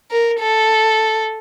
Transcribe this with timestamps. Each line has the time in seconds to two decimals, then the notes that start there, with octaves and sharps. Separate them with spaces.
0.11 A#4
0.40 A4